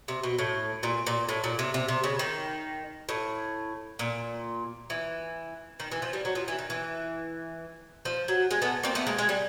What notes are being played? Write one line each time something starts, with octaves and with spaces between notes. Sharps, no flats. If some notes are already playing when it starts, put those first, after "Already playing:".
C3
B2
A2
A#2
A#2
A2
A#2
C3
C3
C3
C#3
D#3
A2
A#2
E3
D#3
E3
F3
G3
F#3
F3
E3
D#3
E3
F3
F#3
G#3
A3 B3
A#3 C4
A3 B3
G#3 A#3
G#3
G3